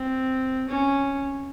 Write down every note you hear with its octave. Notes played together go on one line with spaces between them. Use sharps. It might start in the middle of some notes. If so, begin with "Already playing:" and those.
Already playing: C4
C#4